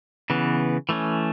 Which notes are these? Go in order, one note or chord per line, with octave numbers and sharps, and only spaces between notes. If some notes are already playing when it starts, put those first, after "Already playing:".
C#3 E3 B3
E3 A3 C#4